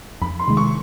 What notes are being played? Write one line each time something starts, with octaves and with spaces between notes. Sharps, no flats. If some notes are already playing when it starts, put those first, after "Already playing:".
F2 B5
C6
C3 D#3 G#3
C#6